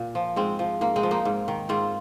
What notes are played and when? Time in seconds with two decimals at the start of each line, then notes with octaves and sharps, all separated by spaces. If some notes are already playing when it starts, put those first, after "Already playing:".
Already playing: A#2
0.15 F3
0.36 G#2 G#3 C4
0.59 F3
0.81 G#2 A#3
0.96 G#3 C4
1.03 F3
1.11 A#3 D#4
1.25 G#2
1.48 D#3
1.69 G#2 C4 F4